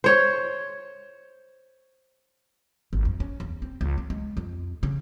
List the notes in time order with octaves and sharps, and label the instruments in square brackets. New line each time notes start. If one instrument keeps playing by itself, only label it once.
[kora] C5 C#5
[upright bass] G#1
F2
C#4
E2
C4
C#2
C4
G#3
F2
C#3